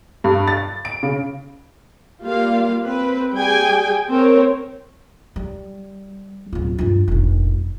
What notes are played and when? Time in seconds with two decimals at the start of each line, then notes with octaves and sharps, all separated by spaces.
0.24 G2
0.47 A6
0.85 D7
1.03 C#3
2.22 G3 A#3 F4 F5
2.84 C4 B4
3.33 G3 G#4 G5 G#5
4.09 C4 A#4 C#5
5.36 G3
6.53 D1 F4
6.78 G2 F4
7.08 F1 A#1